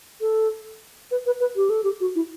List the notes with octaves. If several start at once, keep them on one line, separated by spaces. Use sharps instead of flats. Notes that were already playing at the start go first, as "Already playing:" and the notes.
A4
B4
B4
B4
G4
A4
G4
F#4
E4